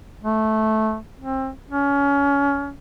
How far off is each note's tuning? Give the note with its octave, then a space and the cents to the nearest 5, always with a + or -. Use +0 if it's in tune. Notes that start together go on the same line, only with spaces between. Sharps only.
A3 -10
C4 +25
C#4 +25